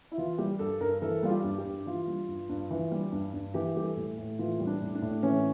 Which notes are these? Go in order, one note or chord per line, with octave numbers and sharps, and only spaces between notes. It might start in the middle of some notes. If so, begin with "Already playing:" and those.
E4
E3 F4
G3 G4
G2 A4
G2 A#4
E3 A4
G3 F4
G4
G2
G4
G2
E3 F4
G3
G2
G2
E3
G3
G2
G2
E3 G4
G3 G4
A4
A2
A2
E3 F4
G3
D4
A2
D4
A2
E3 C#4